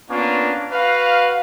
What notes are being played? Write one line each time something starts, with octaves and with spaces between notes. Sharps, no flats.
A#3 B3 C#4 D4 F4
F#4 B4 F5